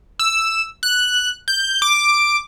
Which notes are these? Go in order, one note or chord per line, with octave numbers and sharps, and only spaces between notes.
E6
F#6
G6
D6